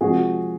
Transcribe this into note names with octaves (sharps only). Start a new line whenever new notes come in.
C3 F3 G#3 F#4 G#4